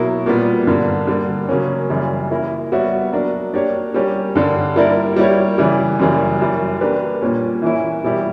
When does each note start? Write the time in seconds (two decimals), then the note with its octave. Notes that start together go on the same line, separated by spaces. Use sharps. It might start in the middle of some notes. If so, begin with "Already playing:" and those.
Already playing: B2 F#3 A#3 E4
0.26 A#2 G3 B3
0.67 G2 D3 A#3
1.07 D3 G3 A#3
1.49 C#3 F#3 A#3 C#4
1.90 F#2 C#3 E3 G3
2.31 A#3 E4 A#4
2.72 G3 B3 F#4 C#5 E5
3.13 F#3 A#3 D4 A#4
3.53 A#3 D4 G4 C#5
3.94 G3 A#3 C#4 G4
4.35 G2 D3 G3
4.76 G3 A#3 E4 A#4 D5
5.16 G3 A#3 E4 G4 C#5
5.58 C#3 E3 G3
5.99 F#2 C#3 E3 G3 A#3
6.40 F#2 E3 G3
6.81 A#3 D4 G4 B4
7.22 A#2 G3 C#4
7.62 E3 A#3 C#4 E4
8.03 B2 G3 A#3 E4 G4